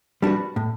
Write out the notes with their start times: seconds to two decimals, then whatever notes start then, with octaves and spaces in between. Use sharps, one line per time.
0.22 G3 D4 F#4 B4
0.56 A2